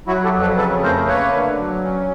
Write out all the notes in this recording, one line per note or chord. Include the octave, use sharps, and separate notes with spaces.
F#3 E4 F#4
G4 A4
F2
A4 B4
C#3 A4 B4
A3 A#4 C5
A#3 B4 C#5
D3
F#3
C#4